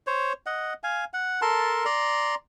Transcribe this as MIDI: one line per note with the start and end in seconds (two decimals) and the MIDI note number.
0.07 0.33 72
0.07 0.33 73
0.46 0.73 75
0.46 0.73 78
0.83 1.04 77
0.83 1.04 80
1.13 1.41 78
1.42 1.85 69
1.42 1.85 70
1.42 1.85 81
1.42 1.85 84
1.85 2.35 74
1.85 2.35 82
1.85 2.35 84